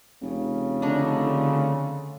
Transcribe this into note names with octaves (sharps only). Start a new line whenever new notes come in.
F1 C#3
D3 A3 D4 D#4